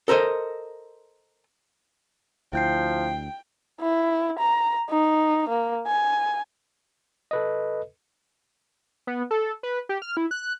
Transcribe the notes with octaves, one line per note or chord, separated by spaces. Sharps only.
A4 A#4 C5 D#5
D2 F3 E4 G5 G6 C7
E4
A#5
D#4
A#3
G#5
A4 B4 D#5
B3
A4
B4
G4
F6
E4
F#6